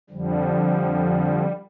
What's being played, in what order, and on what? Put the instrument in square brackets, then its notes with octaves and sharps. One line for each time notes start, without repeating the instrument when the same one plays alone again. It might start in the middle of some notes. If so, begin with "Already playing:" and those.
[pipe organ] F2 D3 F3 G3